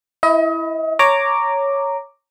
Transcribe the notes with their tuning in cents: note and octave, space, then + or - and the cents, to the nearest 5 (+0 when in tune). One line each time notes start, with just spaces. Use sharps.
E4 +0 D#5 +35
C#5 +0 A#5 -10 D6 +0